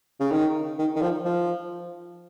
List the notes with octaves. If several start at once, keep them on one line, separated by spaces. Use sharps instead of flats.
C#3
D#3
D#3
D#3
F3
F3